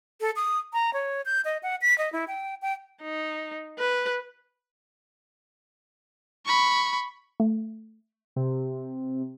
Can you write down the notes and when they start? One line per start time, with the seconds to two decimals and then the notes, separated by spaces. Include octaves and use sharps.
0.21 A4
0.36 D#6
0.73 A#5
0.93 C#5
1.26 G6
1.45 D#5
1.63 F#5
1.82 B6
1.98 D#5
2.13 E4
2.28 G5
2.62 G5
3.02 D#4
3.78 B4
6.46 B5 C#6
7.40 A3
8.36 C3